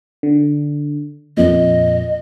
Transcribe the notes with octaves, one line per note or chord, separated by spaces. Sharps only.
D3
F2 A#2 D#5